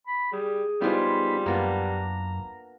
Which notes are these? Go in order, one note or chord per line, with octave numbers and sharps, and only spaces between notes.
B5
G3 G#4
F3 G3 G#3 B3 D#4 F4 B5
F#2 A#3 B3 D4 A#5